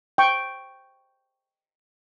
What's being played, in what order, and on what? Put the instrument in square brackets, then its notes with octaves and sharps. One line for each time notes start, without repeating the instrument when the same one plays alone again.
[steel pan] G5 C#6